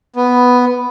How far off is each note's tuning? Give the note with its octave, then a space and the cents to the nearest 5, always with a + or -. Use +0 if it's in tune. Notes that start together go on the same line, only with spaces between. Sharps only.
B3 +0